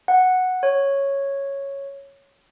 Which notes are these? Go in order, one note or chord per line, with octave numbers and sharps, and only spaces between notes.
F#5
C#5